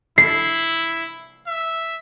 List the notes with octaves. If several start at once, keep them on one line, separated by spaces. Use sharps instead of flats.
E4 C7
E5